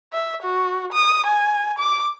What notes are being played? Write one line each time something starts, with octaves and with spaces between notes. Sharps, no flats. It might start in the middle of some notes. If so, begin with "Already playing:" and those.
E5
F#4
D#6
G#5
D6